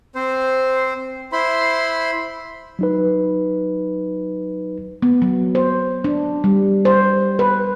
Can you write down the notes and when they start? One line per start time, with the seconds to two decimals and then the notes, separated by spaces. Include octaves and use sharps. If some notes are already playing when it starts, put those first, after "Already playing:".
0.15 C4 C5
1.32 E4 C5 B5 C6
2.79 F#3 D#4 B4
5.02 B3
5.22 F#3
5.55 C5
6.04 D4
6.44 G3
6.85 C5
7.39 B4